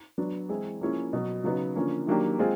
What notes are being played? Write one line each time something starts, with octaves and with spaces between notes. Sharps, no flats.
F#3 B3 D4
E3 G#3 C4 E4 G#4
F3 A#3 C#4 E4 G#4
B2 F#3 B3
C#3 F#3 B3 D#4 F#4
D3 F3 A#3 C#4
D#3 F#3 A#3 D4 G4
G#3 C4 F4 G#4